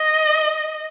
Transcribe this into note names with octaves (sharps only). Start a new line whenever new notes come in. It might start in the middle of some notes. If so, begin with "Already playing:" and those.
Already playing: D#5